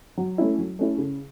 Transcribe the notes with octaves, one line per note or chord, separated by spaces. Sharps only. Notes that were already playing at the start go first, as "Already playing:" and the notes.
F#3
A3 C#4 E4
F#3
A3 C#4 E4
C#3